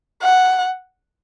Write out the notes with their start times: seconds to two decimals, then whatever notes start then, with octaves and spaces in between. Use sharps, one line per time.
0.22 F#5